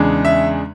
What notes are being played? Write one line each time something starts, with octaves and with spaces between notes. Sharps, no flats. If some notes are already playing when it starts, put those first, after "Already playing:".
Already playing: E2 C#3 G#3 D4
E5